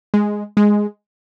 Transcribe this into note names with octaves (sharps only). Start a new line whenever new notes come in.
G#3
G#3